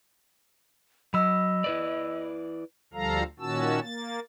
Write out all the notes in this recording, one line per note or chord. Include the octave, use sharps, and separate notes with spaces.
F#3 D#5 B5 E6
E4 B4 D5
D2 F3 G3 A4 F5 A#5
A#2 D#3 C#4 F#4 A5 E6
A#3 A6